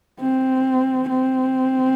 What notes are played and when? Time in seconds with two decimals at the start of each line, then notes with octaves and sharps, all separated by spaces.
0.21 C4
1.09 C4